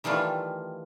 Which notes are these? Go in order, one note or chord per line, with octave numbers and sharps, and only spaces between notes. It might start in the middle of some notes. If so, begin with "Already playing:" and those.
D#3 E3 G3 A3 F4